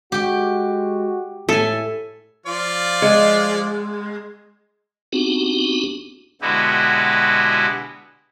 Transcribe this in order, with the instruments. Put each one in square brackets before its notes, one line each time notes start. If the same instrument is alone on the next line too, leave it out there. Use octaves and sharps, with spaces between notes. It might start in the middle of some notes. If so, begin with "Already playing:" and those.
[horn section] G#3 F#4 [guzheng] G4 G5
[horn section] A2 [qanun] A4 [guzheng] E5 G#5
[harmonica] F3 F4 D5
[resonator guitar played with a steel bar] G#3
[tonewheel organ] B3 C4 D4 D#4 F#4 G4
[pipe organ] B2 D3 G#3 E4 F#4 G4